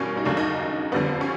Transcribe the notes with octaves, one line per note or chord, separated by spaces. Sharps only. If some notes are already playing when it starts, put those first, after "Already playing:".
Already playing: E2 B2 G3 A#3 C#4
D#4
D#2 C#3 F#3 A3 D4
D#4
F2 D3 G3 B3
C#4